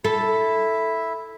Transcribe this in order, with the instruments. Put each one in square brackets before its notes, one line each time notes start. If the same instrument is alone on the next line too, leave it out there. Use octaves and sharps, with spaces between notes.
[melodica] E4 E5 [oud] A4